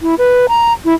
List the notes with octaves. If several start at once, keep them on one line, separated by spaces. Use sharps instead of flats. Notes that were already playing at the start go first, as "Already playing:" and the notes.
E4
B4
A#5
E4